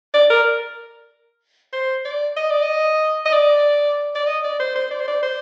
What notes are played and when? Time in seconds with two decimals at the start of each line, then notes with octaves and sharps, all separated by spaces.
0.14 D5
0.30 A#4
1.73 C5
2.05 D5
2.37 D#5
2.50 D5
2.63 D#5
3.26 D#5
3.33 D5
4.15 D5
4.27 D#5
4.44 D5
4.60 C5
4.75 C5
4.91 D5
5.00 C5
5.08 D5
5.23 C5